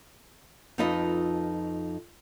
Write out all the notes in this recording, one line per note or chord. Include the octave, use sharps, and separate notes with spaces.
F2 F3 D#4 F4 B4 D#5